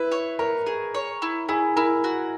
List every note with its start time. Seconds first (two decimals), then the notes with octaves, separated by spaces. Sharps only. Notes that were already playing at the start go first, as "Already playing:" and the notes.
Already playing: E4 B4
0.12 C#5
0.39 A#4 C#5
0.67 G#4
0.95 C#5
1.22 E4
1.49 E4 G#4
1.76 E4 A#4
2.04 F#4